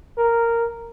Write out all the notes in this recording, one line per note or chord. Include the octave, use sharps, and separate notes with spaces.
A#4